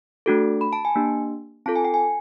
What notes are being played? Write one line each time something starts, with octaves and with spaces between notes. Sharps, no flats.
A3 D4 F#4 A4
B5
A5
G#5
A#3 D4 G4
C4 F4 A4 A5
G#5
G5
G#5